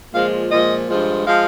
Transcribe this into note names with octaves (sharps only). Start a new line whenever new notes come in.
A#2 F3 G#3 F5
A#2 F3 G#3 D#5
G2 F3 G#3
F3 G#3 F5